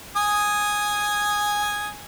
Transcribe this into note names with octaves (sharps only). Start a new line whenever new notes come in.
G#5 D#6